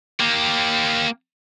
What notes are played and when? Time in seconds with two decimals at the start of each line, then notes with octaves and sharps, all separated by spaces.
0.20 A#3 G4